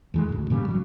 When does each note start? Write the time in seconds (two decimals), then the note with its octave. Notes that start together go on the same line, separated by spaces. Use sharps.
0.14 E2 E3 G#3
0.29 A1 D2
0.50 A#2 C#3 F#3 G3
0.68 A1 F#3